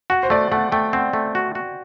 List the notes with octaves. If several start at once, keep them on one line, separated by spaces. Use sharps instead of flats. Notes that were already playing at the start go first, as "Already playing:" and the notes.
F#4 F#5
C5
A3 D5
A3 F#5
A3 G5
C4 F#5
A3
F#4
F#4